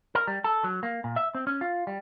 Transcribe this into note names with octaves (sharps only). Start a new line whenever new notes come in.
A#4
G3
A4
F#3
A#3
A#2
E5
C4
C#4
F4
G3